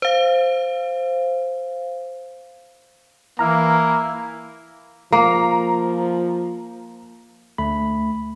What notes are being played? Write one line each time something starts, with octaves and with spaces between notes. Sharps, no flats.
C5 F5
E3 A#3 E4 A#5 F6
F3 A#3 A#5
D2 A3 B5